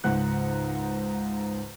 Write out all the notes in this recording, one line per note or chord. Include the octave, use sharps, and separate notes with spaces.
C#2 G#2 F#5 F#6